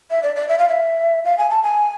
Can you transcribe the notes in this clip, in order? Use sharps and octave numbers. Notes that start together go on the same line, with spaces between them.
E5
D5
D5
E5
F5
E5
F5
G#5
A5
G#5